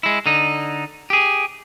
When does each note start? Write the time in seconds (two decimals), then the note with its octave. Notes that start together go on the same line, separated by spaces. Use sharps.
0.03 G#3 E4
0.26 D3 D#4
1.10 G4 G#4